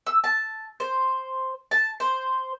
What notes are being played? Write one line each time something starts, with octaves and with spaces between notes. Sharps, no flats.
E6
A5
C5
A5
C5